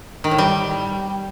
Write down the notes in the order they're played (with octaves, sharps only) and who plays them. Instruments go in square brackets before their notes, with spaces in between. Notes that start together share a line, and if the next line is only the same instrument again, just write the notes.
[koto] D#3
A2
G3